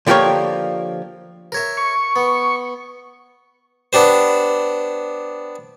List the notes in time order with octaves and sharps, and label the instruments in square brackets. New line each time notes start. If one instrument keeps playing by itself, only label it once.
[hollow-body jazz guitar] D3 F3 A#3 G4 A#4 C#5
[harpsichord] A#4 C#5 E5
[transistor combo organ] C#6
[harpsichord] B3
B3 D4 G4 C5